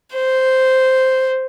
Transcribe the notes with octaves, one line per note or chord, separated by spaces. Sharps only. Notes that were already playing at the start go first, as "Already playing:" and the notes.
C5